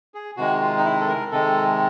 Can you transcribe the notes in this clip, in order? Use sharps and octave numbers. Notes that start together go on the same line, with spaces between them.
G#4
C3 D#3 G#3 F#4
F4
D#4
E4
A4
A#4
C3 D#3 G#3 A4